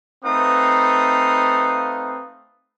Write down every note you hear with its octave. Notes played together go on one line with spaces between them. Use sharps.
A3 C4 D#4 B4 F5 D#6